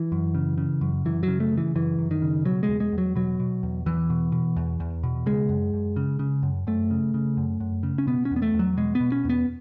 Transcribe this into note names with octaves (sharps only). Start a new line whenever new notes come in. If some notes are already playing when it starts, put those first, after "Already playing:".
Already playing: E3
F#2
C#3
C#3
F#2
F#2 E3
C#3 F#3
A3
C#3
E3
F#2 E3
F#2
D#3
C#3
B2 F#3
G#3
E2
G#3
E2
F#3
B2 F#3
B2
E2
E2 E3
B2
B2
E2
E2
B2
C#3 G#3
F#2
F#2
C#3
C#3
F#2
F#2 A3
C#3
C#3
F#2
F#2
C#3
C#4
B2 B3
C#4
E2
B3
A3
E2
F#3
B2 G#3
B3
B2
C#4
E2 B3